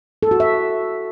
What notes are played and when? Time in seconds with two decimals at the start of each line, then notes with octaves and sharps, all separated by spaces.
0.23 A4
0.31 F#4
0.40 E5